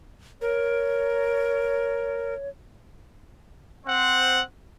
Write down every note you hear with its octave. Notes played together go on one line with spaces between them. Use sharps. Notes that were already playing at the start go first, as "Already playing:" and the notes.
A#4 C#5
C4 C5 F#5